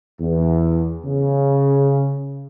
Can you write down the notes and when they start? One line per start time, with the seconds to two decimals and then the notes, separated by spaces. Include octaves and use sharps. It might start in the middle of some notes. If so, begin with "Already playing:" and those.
0.21 E2
1.06 C#3